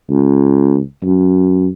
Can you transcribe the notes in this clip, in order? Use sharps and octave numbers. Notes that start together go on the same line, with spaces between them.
C#2
F#2